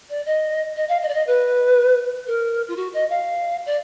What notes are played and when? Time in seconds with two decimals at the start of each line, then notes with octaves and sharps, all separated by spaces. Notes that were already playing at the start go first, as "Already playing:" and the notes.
0.09 D5
0.26 D#5
0.76 D#5
0.88 F5
1.02 D#5
1.08 D5
1.14 D#5
1.27 B4
2.27 A#4
2.68 F4
2.76 F#4
2.93 D#5
3.10 F5
3.66 D5